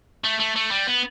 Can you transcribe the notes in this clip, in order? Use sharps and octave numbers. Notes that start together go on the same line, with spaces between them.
A3
A3
A3
G3
B3